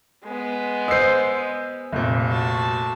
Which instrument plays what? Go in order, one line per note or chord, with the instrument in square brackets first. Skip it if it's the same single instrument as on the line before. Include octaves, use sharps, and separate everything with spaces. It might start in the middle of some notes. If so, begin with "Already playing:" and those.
[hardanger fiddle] G#3 B3
[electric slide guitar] C5 D#5 [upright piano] E6 C7
[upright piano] F1 A#2
[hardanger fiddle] F#4 A5